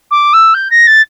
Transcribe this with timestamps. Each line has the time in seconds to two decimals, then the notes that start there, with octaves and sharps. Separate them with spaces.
0.11 D6
0.33 E6
0.54 G6
0.70 A#6
0.87 A6